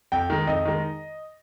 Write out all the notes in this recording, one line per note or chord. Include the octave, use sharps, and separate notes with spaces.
F2 G5
D#3 G#3
F2 D#5
D#3 G#3